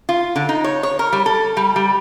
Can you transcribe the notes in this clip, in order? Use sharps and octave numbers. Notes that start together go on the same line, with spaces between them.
F4
D3
D#4
C#5
C#5
A#4
G3
A4
G3
G3